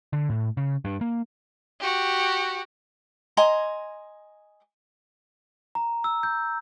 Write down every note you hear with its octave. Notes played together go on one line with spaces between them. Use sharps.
D3
A2
C#3
G2
A#3
F#4 G4
D#5 G#5 A#5 C6
A#5
E6
G6